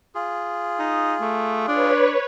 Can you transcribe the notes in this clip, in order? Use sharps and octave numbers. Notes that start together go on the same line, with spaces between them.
F4 G#4
D#4
A3
D4 B4 C#5